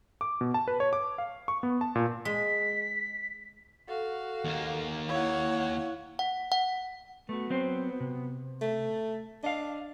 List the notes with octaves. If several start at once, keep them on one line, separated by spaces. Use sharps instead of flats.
D6
B2
A5
B4
C#5
D6
F5
C#6
B3
A5
A#2
G#3 B6
F#4 A4 F5
D#2 A#3
E4 C#5 F5 F#5
F#5
F#5
A3 B3 F#4
F#3 C4 C5
C3
A3
D4 D#5 F5